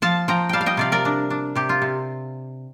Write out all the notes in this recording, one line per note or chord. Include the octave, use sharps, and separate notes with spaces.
F3 F5 A5
F3 G5 A#5
G3 F5 G5 A5
F5
D#5 G5
C3 D5 F5
A#4 D5
D4
D4
C3 G4
F4
C3